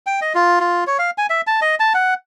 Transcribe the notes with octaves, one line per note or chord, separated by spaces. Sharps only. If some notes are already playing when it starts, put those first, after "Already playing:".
G5
D#5
F4
F4
C#5
F5
G#5
E5
A5
D#5
A5
F#5